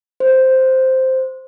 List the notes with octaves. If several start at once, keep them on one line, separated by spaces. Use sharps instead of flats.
C5